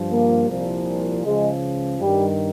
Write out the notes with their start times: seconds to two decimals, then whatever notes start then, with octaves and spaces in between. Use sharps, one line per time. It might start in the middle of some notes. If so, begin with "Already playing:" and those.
Already playing: G2 F3
0.10 A#3
0.48 C2 A#2 F3
1.24 C#2 C#3 F3 G#3
2.00 G2 D#3 G3